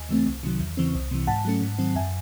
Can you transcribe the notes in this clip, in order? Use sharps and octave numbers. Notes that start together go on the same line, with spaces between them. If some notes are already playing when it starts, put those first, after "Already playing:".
Already playing: D#2 G#5
C#3 E3 A3 C4
C2
C3 D#3 F#3
E2
C#3 E3 C4
C2
C3 E3
G#2 F#5 A5
F#3 A3 C#4
G#2
D#3 F#3 C4
F#2 E5 G#5